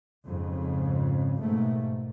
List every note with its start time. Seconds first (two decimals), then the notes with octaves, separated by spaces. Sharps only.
0.25 F2 G#2 C#3
1.39 G#2 B2 A3 A#3